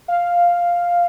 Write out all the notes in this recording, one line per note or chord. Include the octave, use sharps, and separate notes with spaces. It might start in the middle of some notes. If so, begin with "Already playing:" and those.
F5